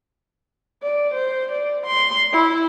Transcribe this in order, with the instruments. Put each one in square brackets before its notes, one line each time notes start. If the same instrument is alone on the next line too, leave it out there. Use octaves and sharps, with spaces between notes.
[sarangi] D5
C5
D5
C6
E4